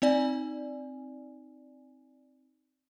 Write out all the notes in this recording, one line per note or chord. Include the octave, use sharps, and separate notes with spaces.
C4 D#4 D5 G#5